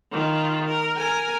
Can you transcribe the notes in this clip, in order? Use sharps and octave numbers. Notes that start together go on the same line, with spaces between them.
D#3 F4
A#4
A#4 G#5